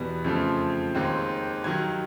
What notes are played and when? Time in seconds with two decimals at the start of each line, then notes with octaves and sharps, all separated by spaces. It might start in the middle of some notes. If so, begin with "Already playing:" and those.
Already playing: E2 B2 G3 B3
0.25 F2 C#3 F3 A3 C4
0.95 D#2 D#3 G#3 C4
1.64 G2 D#3 F#3 G#6